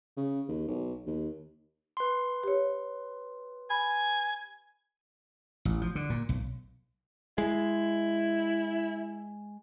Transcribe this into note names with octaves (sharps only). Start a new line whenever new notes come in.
C#3
D#2
B1
D#2
B4 C6
G4 C#5
G#5 B5
A1
F3
D3
A#2
B1
G#3 E4